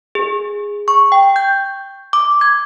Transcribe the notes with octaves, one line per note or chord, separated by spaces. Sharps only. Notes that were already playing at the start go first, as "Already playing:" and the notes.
G#4
C#6
G5
G6
D6
G#6